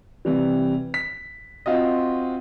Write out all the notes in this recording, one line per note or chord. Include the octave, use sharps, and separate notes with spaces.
C3 E3 G3
B6
C4 F4 F#4 D#5